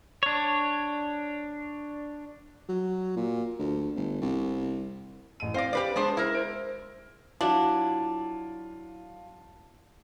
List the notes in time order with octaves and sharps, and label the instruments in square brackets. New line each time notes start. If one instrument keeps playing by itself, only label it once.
[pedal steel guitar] D4 C#5
[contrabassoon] F#3
A#2
D2
G1
C2
[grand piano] A1 D#7
[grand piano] C4 F5 A#6 [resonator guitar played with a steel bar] C5 D5
[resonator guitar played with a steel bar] G4 B4 D5
[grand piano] G#3 [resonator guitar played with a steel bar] B3 D4 C5
[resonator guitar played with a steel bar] E4 A#4
[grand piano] C5 D7
[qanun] F#3 E4 [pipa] D4 [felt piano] F4